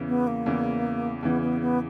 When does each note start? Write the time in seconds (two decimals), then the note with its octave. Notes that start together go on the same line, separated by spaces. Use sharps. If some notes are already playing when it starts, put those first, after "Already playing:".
Already playing: E2 C#3 E3
0.08 B3
0.27 A#3
0.46 E2 C#3 E3
1.22 E2 C#3 E3 B3
1.42 B3
1.61 B3